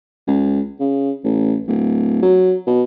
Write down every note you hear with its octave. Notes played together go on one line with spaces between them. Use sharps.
C#2
C#3
A1
D1
F#3
B2